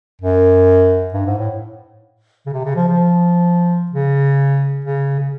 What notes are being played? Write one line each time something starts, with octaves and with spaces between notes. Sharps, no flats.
F#2
G2
G#2
A2
C#3
C3
C#3
F3
F3
C#3
C#3
C#3